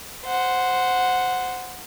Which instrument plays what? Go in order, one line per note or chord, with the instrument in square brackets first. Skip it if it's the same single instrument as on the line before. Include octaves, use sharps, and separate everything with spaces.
[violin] C5 F#5